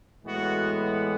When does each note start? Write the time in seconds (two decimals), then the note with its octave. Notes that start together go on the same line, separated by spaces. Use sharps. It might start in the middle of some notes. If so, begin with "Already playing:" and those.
0.24 A2 E3 G#3 B3 F#4